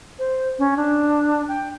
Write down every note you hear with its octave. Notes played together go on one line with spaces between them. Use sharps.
C5
C#4
D4
G5